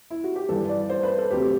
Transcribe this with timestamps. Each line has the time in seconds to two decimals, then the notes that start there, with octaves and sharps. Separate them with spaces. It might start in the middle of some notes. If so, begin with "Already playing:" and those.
0.11 E4
0.24 F#4
0.36 G4
0.49 G2 E3 G3 A4
0.69 D5
0.90 C5
1.03 B4
1.18 A4
1.31 D2 C3 F#3 A3 G4